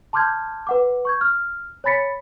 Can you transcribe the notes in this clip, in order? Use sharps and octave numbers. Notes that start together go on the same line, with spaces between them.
A5 C6 D6 F6 G6 G#6
B4 F#5 D6
C#6 G6 G#6
F6
C#5 G#5 B5 A6 B6 C#7